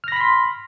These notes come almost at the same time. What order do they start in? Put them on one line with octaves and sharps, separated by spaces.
F6 A#6 B5 B6 C6